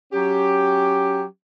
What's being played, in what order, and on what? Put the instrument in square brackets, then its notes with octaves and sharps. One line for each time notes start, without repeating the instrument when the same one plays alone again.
[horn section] F#3 C#4 G4